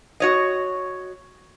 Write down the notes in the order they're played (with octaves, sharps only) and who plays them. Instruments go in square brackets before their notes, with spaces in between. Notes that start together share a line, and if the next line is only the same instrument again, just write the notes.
[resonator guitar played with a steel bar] F#4 C#5 D#5